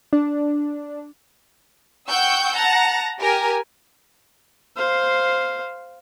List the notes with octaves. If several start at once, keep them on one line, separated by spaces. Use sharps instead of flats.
D4
F#5 G5 C#6 E6 G6
F#5 A5 A#5
G4 A#4 G#5
C5 F5